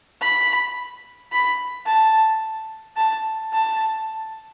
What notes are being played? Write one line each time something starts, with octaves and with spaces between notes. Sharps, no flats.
B5
B5
A5
A5
A5